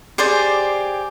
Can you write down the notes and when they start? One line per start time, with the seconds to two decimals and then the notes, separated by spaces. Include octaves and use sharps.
0.18 G4 G#4 C5 D5